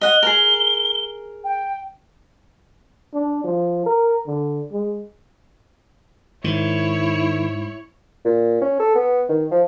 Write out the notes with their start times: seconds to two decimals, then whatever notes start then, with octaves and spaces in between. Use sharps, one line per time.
0.01 D#5 F#5 G7
0.23 G#4 A#4
1.44 G5
3.14 D4
3.44 F3
3.86 A#4
4.27 D3
4.72 G#3
6.44 G#2 D#3 E4 C#5
8.25 A#2
8.61 C#4
8.80 A4
8.95 B3
9.29 D#3
9.51 F3